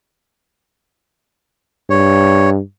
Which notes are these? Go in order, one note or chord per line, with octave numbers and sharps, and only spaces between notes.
G2 C#5